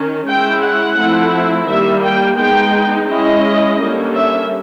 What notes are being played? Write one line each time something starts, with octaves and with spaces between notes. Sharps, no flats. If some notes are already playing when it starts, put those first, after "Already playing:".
Already playing: D#3 C#4
G#3 C#4 E4 G5
F#5
F3 A3 C4 E4
D#3 G3 A#3 E5
G5
G#3 B3 D#4 G5
G#3 C#4 E4 D#5
D3 G3 A#3 C#4
E5